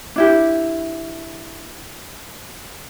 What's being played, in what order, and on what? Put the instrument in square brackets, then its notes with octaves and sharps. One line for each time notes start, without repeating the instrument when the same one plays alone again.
[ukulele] D4 E4 G4